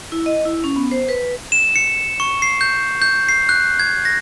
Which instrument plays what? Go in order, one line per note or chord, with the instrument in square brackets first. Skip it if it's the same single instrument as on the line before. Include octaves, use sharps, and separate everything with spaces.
[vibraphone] E4
D#5
E4
C#4
B3
C5
B4
[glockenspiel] E7
C#7
C#6
C7
G6
G6
C7
F#6
G#6
A#6